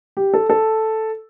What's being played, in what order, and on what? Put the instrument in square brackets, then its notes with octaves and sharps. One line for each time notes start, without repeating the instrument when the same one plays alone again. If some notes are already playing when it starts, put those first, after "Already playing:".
[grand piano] G4
A4
A4